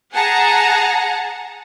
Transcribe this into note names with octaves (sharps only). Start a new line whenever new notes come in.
G#4 F#5 A5 A#5